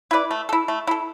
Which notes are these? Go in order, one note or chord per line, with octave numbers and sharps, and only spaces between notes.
E4 B4 D5
A3
E4 A4
A3
E4 A4